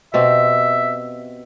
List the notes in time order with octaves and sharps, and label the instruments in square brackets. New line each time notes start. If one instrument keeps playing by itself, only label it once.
[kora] B2 C4 G4 [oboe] E5